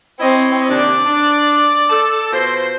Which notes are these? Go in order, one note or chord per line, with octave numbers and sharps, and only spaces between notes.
C4 E4 C#5 D#5
D#2 C3 D4 D5
D4
A4
B2 F4 C5